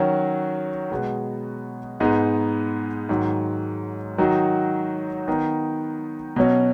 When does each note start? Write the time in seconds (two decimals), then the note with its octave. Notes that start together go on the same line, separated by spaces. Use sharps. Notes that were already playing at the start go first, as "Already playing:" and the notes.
Already playing: D#3 F#3 C#4 F#4
0.90 B2 G#3 B3 F#4
2.00 G#2 G#3 B3 D#4
3.09 G#2 D#3 F#3
4.18 D#3 F#3 D#4 F#4
5.28 D#3 B3 D#4
6.36 B2 F#3 C#4